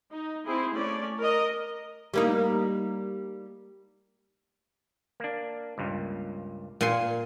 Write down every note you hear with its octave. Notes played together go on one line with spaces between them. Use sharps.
D#4
C4 E4 G#4
A3 C#4 D5
A#4 D#5
G3 A#3 D#4
A#3 D4
C#2 G2 A#2
A#2 G#5 C6